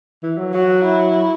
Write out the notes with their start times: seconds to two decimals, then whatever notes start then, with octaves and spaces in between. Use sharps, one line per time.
0.23 E3
0.38 F#3
0.53 F#3 F#4
0.84 E4
1.14 F#3